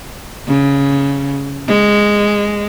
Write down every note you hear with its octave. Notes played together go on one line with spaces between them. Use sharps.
C#3
G#3